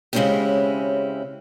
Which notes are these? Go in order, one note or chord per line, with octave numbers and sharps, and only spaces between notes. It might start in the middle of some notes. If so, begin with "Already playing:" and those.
C#3 G#3 C4 C#4 E4 G4